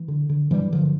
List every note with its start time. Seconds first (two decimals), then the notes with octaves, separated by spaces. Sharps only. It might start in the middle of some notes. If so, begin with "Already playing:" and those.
Already playing: E3
0.08 D3
0.29 D3
0.50 G2 E3 G3
0.72 G2 D3 F3